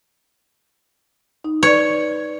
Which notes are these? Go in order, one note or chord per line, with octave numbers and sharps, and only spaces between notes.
D#4
B4 C#5 D5